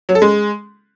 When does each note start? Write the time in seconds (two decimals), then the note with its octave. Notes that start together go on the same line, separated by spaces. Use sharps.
0.09 F#3
0.15 A4
0.22 G#3